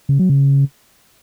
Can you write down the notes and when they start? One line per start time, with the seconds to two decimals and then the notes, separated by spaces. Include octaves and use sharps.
0.09 C#3
0.19 F#3
0.29 C#3